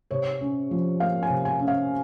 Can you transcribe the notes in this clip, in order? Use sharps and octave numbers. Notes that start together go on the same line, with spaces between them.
C3 C#5
C#4
F3
A#3 F5
G#5
C3
G#5
C#4
F5